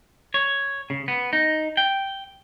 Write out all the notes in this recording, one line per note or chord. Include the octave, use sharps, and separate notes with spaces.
C#5
C#3
B3
D#4
G5